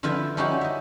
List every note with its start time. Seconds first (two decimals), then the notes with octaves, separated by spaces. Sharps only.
0.03 D3 F3 E4 F4 B4 E5
0.37 F3 C#4 D#4 E4 F#4 G4
0.61 D#5 E5